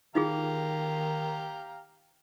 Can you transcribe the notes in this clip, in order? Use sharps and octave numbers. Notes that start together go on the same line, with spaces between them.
D#3 D#4 F4 G4 G#4 F5 A#5